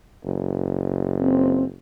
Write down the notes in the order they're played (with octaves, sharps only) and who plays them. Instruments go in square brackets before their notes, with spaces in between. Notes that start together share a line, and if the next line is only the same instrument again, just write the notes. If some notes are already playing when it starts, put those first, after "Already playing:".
[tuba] F#1
[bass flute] C4